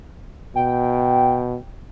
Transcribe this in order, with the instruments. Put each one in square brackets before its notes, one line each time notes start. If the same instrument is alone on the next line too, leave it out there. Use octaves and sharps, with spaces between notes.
[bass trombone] B2 [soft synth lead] G5